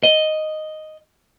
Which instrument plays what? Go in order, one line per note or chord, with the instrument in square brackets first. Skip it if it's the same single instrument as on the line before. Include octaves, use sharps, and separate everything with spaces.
[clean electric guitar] D#5